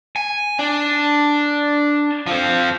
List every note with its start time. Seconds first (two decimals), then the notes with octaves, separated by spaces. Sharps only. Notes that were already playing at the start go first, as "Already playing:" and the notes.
0.16 G#5
0.59 D4
2.27 F3 C4